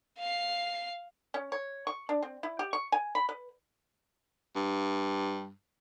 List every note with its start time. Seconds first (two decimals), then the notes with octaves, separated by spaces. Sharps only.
0.19 F5 C7
1.34 C#4
1.52 C#5
1.87 C#6
2.09 D4
2.22 C4
2.43 E4
2.59 G4
2.73 C#6
2.92 G#5
3.15 B5
3.29 B4
4.55 G2